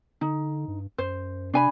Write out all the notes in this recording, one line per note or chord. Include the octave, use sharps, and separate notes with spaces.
D3 D#4
G2
F#2 C5
C3 D4 G#5 B5